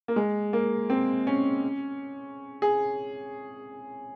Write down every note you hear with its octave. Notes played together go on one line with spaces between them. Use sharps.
A#3
G#3
A#3
C4
C#4
G#4